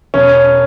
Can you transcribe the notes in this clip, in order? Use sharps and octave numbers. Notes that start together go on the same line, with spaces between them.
E1 C#4